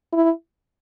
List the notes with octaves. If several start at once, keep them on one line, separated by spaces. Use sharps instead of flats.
E4